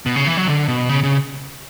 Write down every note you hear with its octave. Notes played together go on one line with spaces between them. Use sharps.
B2
C#3
E3
F#3
D3
B2
C#3
C#3